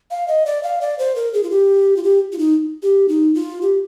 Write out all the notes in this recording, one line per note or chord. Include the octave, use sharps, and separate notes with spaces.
F5
D#5
D5
F5
D5
C5
A#4
G#4
F4
G4
F4
G4
F4
D#4
G4
D#4
F4
G4